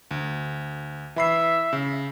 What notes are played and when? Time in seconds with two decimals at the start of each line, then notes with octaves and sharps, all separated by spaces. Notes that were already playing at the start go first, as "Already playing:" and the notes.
0.11 D2
1.16 E3 E5 B5 C7
1.73 C#3